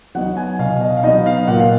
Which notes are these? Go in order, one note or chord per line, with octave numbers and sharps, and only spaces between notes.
F#3 B3 D#4 F#5
G#5
B2 F5
D#5
F5
F#3 B3 D#4 D#5
F5
A#2 F#5
F5